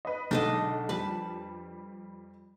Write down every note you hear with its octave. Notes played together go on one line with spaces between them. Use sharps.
B4 D#5
B1 D3 G#3 D4 A4 D#5
F2 G3 B4 A5